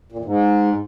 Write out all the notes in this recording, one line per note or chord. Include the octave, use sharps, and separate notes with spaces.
A#2
E2
G#2